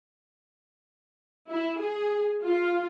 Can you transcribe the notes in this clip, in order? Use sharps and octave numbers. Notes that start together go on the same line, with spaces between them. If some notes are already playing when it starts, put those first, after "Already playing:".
E4
G#4
F4